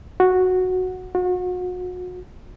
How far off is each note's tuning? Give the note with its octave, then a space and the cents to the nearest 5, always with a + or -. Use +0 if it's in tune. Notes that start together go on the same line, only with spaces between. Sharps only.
F#4 -5
F#4 -35